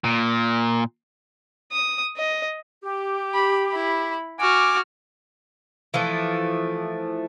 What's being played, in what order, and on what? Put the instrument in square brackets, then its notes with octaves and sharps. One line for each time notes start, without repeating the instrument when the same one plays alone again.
[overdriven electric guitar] A#2
[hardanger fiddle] D#6
D#5
[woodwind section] G4
[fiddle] B5
E4 B5
[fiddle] F#4 F6 [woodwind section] G#5 D6
[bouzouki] E3 F3 A3